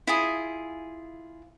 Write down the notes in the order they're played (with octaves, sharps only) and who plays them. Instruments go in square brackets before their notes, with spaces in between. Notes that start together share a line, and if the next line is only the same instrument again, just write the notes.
[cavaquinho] E4 F4 G#4 G#5